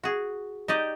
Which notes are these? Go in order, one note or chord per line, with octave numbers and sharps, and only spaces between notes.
F#4 G#4
D#4 G4 D5 D#5